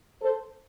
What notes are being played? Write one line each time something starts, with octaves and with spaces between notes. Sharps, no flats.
A4 C5